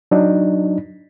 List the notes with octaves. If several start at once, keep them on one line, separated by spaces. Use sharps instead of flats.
F#3 D4 D#4